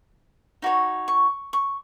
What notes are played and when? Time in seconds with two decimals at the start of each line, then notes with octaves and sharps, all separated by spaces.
0.62 D#4 F#4 C#5
1.08 C#6
1.53 C#6